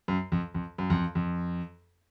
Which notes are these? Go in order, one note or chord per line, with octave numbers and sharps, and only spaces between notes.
F#2
F2
F2
F#2
F2
F2